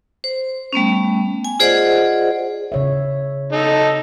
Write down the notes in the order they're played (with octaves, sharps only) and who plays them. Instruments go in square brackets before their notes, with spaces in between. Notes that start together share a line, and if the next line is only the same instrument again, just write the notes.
[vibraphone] C5
G3 A3 B3 C#4
G#5
F4 G#4 C5 D5 D#5 F#5
[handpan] C#3 C#5 E5
[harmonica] D#4 A4